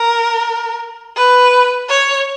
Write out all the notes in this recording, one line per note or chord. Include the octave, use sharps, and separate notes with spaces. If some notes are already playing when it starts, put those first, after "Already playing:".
Already playing: A#4
B4
C#5